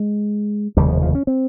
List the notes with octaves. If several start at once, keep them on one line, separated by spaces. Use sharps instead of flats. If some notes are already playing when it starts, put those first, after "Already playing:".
Already playing: G#3
F1 D#2 C#3 G3
F3
F3
C#4
C4